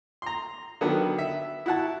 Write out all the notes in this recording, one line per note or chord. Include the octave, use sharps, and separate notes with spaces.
A#5 C6
D3 D#3 F#3 B3
E5
E4 F#4 F#5 A5